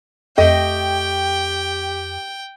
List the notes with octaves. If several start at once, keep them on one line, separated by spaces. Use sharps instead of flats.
F2 A3 G4 D#5 G5